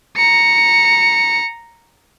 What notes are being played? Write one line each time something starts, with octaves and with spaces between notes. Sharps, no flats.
A#5 C#7